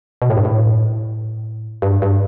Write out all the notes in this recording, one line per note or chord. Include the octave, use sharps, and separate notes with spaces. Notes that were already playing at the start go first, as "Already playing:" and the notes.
B2
A2
G2
A2
G2
G2